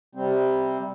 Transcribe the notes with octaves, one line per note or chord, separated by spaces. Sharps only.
C3 G3 C4